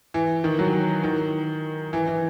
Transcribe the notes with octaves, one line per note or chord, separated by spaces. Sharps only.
E3
D#3
F#3
D#3
E3
E3